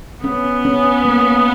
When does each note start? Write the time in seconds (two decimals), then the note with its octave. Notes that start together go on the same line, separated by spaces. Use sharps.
0.24 B3 C#4
0.65 C#4
1.05 A#3